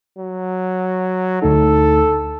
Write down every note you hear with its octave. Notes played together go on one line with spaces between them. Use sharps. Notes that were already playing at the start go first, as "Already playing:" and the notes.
F#3
D2 A3 D#4 A4